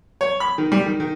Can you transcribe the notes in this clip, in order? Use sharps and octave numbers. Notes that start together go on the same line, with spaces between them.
C#5
B5
D#3
G3
D#3
D#3